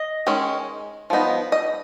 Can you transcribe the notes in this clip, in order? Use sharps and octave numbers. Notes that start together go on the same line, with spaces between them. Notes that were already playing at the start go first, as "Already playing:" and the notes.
Already playing: D#5
D#3 G#3 C#4
F3 B3 D#4
D#5